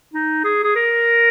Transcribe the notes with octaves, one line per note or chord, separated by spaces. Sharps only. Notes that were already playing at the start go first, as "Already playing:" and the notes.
D#4
G#4
G#4
A#4